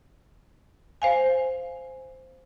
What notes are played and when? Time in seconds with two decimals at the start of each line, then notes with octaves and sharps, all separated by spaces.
1.02 C5 F5 G#5